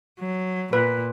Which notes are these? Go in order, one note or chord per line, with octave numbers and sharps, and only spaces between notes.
F#3
A#2 B4